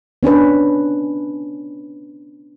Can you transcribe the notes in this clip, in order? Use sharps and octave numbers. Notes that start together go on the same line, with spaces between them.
B3 C#4 D4 B4